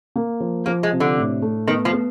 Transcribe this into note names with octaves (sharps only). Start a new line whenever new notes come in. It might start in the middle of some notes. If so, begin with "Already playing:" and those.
A#3
F3
F3 A#3
G#3
C3
D3
A2
A3
D#3 B3
F3
B3